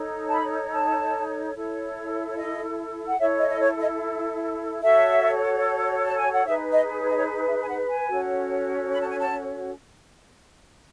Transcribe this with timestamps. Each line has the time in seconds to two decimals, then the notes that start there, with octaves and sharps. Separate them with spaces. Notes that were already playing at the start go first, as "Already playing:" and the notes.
Already playing: D#4 A4 C#5
0.28 A5
0.32 B5
0.73 A5
1.54 E4 A4 C#5
2.28 C#5
2.37 D#5
3.07 F#5
3.19 E4 A4 C#5 E5
3.39 D#5
3.49 D#5
3.60 C#5
3.79 D#5
4.82 F#4 A4 C#5 E5
6.04 A5
6.18 G#5
6.33 F#5
6.45 D#4 G#4 B4 E5
6.72 D#5
7.01 C#5
7.09 D#5
7.17 C#5
7.47 E5
7.62 G#5
7.68 F#5
7.89 G#5
8.10 C#4 F#4 A4 C#5
8.92 B5
9.01 A5
9.09 G#5
9.19 A5